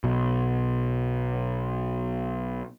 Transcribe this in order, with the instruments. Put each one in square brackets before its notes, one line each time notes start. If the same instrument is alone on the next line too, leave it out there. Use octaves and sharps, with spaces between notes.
[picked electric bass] B1 B2